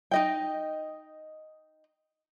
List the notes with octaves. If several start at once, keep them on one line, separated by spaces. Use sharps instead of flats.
D#4 D#5 G5